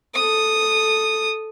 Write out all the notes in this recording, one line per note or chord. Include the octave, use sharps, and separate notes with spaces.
A4 D#6